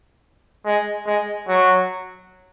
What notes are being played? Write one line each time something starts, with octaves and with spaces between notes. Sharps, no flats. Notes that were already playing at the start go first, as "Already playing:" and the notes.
G#3
G#3
F#3